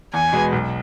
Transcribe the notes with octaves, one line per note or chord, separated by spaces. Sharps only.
E2 G#5
B2 G#3 B3
B1